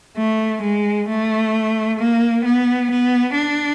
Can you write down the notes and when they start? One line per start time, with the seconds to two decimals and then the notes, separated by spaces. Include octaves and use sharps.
0.17 A3
0.62 G#3
1.09 A3
1.99 A#3
2.45 B3
2.91 B3
3.36 D4